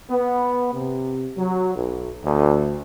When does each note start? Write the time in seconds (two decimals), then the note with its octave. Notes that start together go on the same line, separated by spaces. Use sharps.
0.10 B3
0.73 C3
1.36 F#3
1.74 B1
2.23 D2